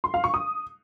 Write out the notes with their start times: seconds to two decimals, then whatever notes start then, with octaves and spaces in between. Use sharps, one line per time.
0.04 C6
0.14 F5
0.24 C#6
0.34 D#6